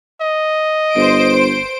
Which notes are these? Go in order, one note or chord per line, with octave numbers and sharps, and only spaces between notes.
D#5
G1 C5 D7